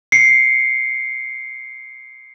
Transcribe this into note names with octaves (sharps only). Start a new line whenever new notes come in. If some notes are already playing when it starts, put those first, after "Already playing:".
C7 C#7